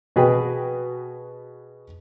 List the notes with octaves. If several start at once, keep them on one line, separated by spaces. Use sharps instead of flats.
B2 F#4 G#4 B4 G5